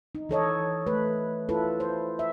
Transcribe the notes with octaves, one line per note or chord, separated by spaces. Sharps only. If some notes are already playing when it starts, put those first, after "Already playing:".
D#4
E3 A4 C#5 D#5
A3 B4
E4 F4 A4 B4
C5
E5